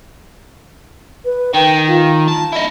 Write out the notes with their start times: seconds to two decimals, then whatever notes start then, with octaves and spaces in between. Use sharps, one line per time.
1.25 B4
1.54 D#3 G5
1.88 F4
2.28 A5
2.53 E4 D#5